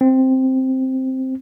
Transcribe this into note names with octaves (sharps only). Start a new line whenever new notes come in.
C4